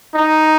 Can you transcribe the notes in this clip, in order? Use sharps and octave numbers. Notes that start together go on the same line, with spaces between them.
D#4